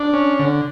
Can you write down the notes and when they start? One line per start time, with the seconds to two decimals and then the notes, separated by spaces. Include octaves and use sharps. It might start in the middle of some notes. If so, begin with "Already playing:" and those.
Already playing: D4
0.13 C#4
0.39 D3